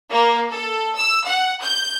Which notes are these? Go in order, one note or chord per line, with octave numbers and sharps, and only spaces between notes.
A#3
A4
E6
F#5
G6